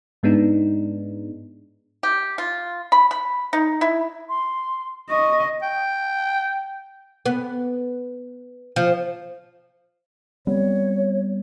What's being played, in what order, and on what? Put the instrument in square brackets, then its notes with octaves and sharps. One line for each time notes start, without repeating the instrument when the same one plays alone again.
[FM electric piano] G#2 G#3 B3 D4 D#4
[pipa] G4
F4
B5
B5
D#4
E4
[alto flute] C6
[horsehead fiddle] D#5 [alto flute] C#6
[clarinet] G5
[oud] B3
F3
[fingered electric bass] G3 B3 C4 [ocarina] C#5